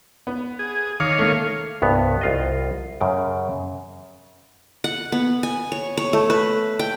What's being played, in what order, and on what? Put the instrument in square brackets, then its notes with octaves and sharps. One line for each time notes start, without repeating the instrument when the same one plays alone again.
[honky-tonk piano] B3
[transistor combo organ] G#4
[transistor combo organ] D#3 C#5 F5 [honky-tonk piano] D6
[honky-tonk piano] A3 A#3
[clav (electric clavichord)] C2 G2 B3
C2 F4 D#5
F#2 C#3 G5
[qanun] F#5
B3
G#5
C#5
C#5
A3
B4
G5